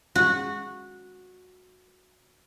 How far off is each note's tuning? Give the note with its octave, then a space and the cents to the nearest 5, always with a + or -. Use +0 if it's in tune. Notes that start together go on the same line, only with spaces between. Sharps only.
F#4 -15